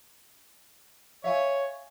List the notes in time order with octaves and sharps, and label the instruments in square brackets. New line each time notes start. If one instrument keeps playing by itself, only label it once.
[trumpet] C#5 [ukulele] E5 F5 G#5